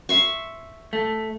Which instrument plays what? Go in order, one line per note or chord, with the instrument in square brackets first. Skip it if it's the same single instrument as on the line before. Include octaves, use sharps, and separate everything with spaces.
[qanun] E5 C6 C#6
[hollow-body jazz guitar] A3